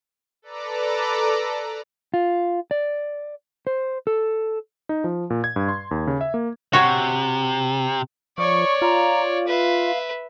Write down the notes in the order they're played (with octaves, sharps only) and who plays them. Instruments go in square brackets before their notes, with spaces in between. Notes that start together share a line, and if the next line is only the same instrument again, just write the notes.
[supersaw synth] A4 B4 D5 A#5 D6
[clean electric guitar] F4
D5
C5
A4
[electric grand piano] D#4
F3
A#2
G#6
G2
C6
D#2
C#3
E5
A#3
[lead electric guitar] C3 [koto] F#4 C#5
[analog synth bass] F3 [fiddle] C#5 D5 [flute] C#6
[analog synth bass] F4 [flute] A#5
[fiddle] B4 E5 [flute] F5